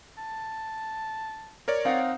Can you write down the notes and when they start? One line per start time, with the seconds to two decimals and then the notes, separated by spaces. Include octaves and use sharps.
0.18 A5
1.68 A#4 C#5 D5
1.85 C4 D#4 F5 F#5